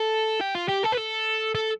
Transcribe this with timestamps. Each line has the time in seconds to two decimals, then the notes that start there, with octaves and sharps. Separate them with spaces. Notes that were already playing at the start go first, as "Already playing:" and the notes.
Already playing: A4
0.41 G4
0.55 F4
0.68 G4
0.83 A4
0.92 B4
0.97 A4
1.55 A4